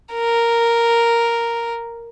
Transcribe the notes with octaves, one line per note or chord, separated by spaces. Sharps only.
A#4